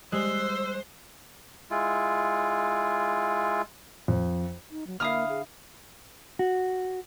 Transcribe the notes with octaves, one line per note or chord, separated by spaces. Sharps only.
G3 G#3 C5 E6 F#6
G#3 E4 F4
F2
D#4
F#3
D3 A#3 E4 F5 D#6 F6
G#4
F#4